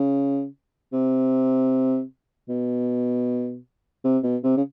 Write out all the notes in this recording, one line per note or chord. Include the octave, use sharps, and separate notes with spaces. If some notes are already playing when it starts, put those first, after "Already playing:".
Already playing: C#3
C3
B2
C3
B2
C3
C#3